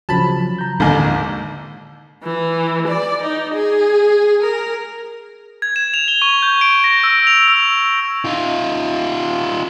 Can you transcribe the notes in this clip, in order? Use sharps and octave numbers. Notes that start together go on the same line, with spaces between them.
C#3 F3 F#3 A5 B5
A#5 G6
A1 D#2 D3 G#3
E3
D5
D#4
G#4
A#4
G#6
E7
F7
G7
C#6
G6
D7
A#6
E6
F7
E6
D#4 F4